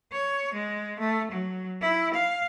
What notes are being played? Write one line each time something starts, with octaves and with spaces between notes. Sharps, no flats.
C#5
G#3
A3
F#3
E4
F5